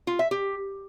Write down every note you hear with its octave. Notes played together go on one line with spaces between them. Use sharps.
F4
E5
G4